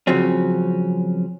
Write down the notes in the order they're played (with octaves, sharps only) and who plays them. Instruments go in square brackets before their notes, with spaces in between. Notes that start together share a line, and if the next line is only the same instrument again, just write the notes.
[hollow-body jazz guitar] C#3 F3 F#3 C4 C#4